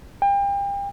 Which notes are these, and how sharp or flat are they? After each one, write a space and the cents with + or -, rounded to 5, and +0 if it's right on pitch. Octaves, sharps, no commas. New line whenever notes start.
G5 +35